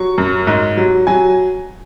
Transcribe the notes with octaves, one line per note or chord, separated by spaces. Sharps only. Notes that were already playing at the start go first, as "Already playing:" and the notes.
Already playing: F#3 C#6
F#2
G#2
F#3
F#3 G#5